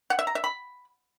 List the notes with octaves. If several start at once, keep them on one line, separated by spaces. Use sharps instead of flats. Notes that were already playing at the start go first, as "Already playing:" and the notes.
F#5
E5
A#5
E5
B5